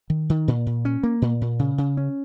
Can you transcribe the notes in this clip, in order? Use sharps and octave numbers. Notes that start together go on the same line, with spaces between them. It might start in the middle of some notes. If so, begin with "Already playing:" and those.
D#3
D#3
A#2
A#2
C#4
A#3
A#2
A#2
C#3
C#3
C#4